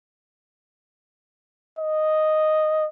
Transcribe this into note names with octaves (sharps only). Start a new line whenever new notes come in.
D#5